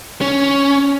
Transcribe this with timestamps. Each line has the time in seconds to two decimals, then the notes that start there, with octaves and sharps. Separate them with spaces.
0.21 C#4